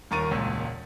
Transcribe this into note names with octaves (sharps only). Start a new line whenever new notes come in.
D#1 D#2 A#4 C#6 A6 D#7
E1 C#2 A#2 E6